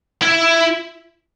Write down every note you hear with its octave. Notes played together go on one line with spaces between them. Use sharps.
E4